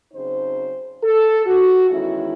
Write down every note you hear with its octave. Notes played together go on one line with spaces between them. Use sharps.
C#3 F#3 C4 D#4 C5
A4
F#4
E2 D#3 G#3 C#4 E4